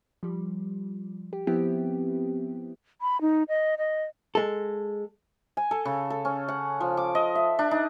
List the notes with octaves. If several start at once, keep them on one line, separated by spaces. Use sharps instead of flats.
F3 G3
G4
F3 B3 C4 E4 G4
B5
D#4
D#5
D#5
G#3 A4
G#5
A4
C#3
A4
C#4
F#5
F3
D6
D#5
E5
D4
D#4